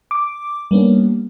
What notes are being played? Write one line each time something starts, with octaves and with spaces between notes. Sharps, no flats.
D6
G3 A#3 B3 C#4 D4